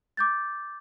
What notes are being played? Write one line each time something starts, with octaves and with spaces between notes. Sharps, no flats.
D6 G6 A6